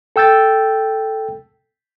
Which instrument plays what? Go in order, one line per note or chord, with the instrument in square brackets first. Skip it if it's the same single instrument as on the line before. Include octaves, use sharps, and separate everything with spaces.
[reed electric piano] A4 G5 E6 G6 A6